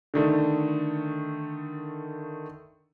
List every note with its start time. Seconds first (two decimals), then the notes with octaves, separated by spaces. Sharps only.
0.14 D3 D#3 A3